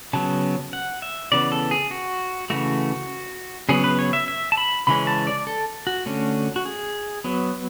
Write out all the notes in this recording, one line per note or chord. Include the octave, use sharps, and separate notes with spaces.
C#3 F#3 B3 A5
F#5
E5
C#3 E3 B3 D5
A4
G#4
F#4
C#3 E3 A3 F#4
C#3 F#3 B3 G#4
B4
C#5
E5
E5
A5
B5
C#3 E3 G#3 C#4 B5
A5
D5
A4
F#4
D3 A3 C#4
F#4
G#4
F#3 B3